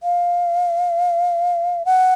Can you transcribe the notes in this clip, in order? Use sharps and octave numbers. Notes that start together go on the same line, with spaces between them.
F5
F#5